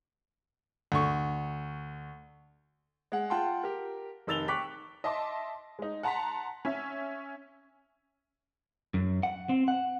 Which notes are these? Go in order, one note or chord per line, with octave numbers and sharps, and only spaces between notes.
D2 C#6
G#3 F#5
F4 F#5 G5 A5 C6
G4 A#4
F1 D#3 E6 A6 F7 G7
G5 C#6 D6 F#6 B6
D#5 E5 A5 C6 D6
G#3 D#4
F#5 A5 A#5 C6 B6
C#4 E5
F#2
F#5
C4
F#5